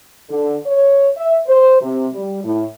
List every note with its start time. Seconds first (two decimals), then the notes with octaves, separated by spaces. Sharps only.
0.29 D3
0.67 C#5
1.17 E5
1.47 C5
1.82 C3
2.13 G3
2.44 A2